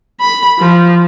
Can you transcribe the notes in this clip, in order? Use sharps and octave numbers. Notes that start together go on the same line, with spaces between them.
B5
F3